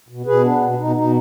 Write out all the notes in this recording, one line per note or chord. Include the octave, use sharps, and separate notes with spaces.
B2
B2 G#4 B4
B3 D4
B2
B2 D#4
B2 D#4